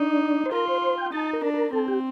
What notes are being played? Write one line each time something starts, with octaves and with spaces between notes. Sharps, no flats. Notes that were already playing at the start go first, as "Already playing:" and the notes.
Already playing: D4 D#4
C5
F4 A#4
C5
C5
G5
D#4 A5
A#4
D4
A#4
C4 A4
G4